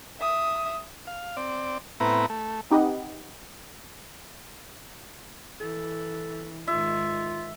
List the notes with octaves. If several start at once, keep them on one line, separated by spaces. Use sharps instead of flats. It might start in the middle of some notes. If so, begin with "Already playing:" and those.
E5 D#6
F5
C4 D5
A2 B3 C4 E4 B4 A#5
A3
C4 D#4 G4 B4 D#5 F#5
E3 A4
G#2 D#3 F4 E5